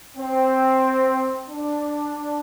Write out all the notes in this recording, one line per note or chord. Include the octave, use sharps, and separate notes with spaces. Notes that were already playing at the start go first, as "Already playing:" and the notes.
C4
D4